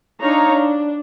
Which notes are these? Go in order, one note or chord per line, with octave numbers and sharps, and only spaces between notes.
D4 D#4 C#5 F5 A#5
D4